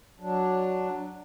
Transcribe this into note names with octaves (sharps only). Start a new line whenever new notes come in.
F#3 D4